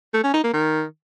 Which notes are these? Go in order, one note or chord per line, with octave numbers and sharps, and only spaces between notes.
A3
C#4
D#4
A#3
D#3